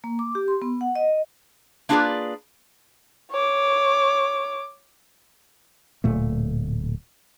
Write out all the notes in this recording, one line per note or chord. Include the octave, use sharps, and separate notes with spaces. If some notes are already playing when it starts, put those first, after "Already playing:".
A#3
D6
G4
C6
B3
F#5
D#5
A#3 D4 F4 G#4 B4 D5
C#5 D6
D1 A#2 A3